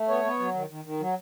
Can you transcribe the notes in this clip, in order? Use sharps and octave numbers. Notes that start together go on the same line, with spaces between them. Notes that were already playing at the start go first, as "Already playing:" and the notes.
Already playing: A3
B3 C#5
B3
F#3
D#3
D#3
D#3
F#3